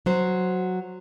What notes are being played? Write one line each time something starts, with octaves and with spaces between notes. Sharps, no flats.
F#3 F#4 C5